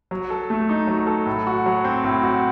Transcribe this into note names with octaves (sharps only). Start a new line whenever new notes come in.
F#3
A4
A3
D#4
F#3
A4
A2
F#4
F#3
C4
A2
F#4